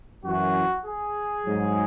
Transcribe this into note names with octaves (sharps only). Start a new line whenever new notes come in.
F#2 E3 F#4
G#4
G#2 F#3